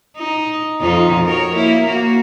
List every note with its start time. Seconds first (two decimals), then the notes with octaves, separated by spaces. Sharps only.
0.17 D#4
0.81 F2 D#4 F4
1.23 F#4 A#4 C#5
1.55 A#3 E4
1.87 A#3 F#4